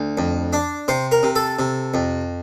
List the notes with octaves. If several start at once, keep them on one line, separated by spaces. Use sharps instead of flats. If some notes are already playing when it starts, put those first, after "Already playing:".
Already playing: D2
F2
D4
C3 C5
A#4
C3
A4
C3
F2